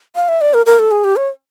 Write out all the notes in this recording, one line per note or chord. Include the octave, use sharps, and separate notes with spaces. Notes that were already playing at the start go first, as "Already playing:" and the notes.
F5
E5
D5
A#4
A#4
A4
G#4
G4
C#5